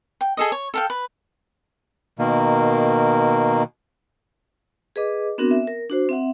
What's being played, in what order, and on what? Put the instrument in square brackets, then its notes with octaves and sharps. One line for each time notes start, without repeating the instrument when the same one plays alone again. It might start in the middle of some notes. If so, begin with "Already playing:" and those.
[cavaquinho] G5
G#4 A4 D#5
C#5
A4 F5 G5
B4
[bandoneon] B2 D#3 A#3
[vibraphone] G#4 B4 D#5 D6
B3 C4 D4 F#4 A#4
E5
A#4
D4 F#4 C5
C4 E5 F#5